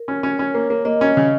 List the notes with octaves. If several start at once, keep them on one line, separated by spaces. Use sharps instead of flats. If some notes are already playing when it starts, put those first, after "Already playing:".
Already playing: A#4
C#4
C#4
C#4 C#5
A#3
A#3
A#3 D#5
C#4
C#3